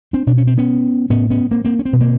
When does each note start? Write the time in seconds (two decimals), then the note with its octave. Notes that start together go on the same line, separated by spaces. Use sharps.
0.13 C4 D4
0.27 B2 D4
0.38 C#4
0.47 C4
0.58 B3 C#4
1.10 A2 B3 C#4
1.30 B3 C#4
1.51 A#3 C4
1.65 A#3 C4
1.79 C#4
1.85 C4
1.93 B2 B3
2.01 A#3 C4